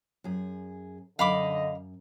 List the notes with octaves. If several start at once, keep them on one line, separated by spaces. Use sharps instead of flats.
F#2 G#4
F#2 D3 D#5 F5 B5 D6